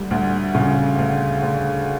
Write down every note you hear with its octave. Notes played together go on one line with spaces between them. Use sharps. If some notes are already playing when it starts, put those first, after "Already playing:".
Already playing: D2 G3
D2
C#3
D2
D2